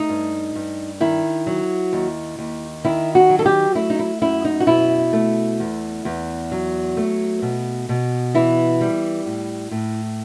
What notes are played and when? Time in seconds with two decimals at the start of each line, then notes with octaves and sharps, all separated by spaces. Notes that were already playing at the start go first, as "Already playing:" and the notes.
Already playing: A3 D#4
0.09 G2
0.55 G2
1.00 D#3 E4
1.47 F#3
1.93 D#2
2.39 D#2
2.84 D#3 E4
3.15 F#4
3.29 F#3
3.39 A4
3.46 G4
3.75 A3 E4
3.90 D#4
3.99 E4
4.22 F#2 E4
4.45 D#4
4.60 F#4
4.67 B2 E4
5.13 A3
5.60 E2
6.05 E2
6.52 F#3
6.97 A3
7.42 B2
7.89 B2
8.34 E3 E4
8.81 G3
9.26 A2
9.71 A2